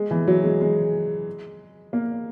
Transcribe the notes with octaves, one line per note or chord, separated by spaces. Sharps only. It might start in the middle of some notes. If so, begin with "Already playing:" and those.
Already playing: G#3
E3
F#3
G#3
G#3
A#3